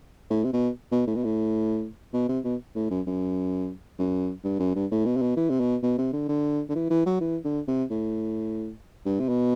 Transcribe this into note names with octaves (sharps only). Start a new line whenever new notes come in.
A2
C3
B2
B2
A2
B2
A2
B2
C3
B2
A2
F#2
F#2
F#2
G2
F#2
G2
A2
B2
C3
B2
E3
C3
B2
B2
C3
D3
D3
D3
E3
E3
F#3
E3
D3
C3
A2
G2
C3
B2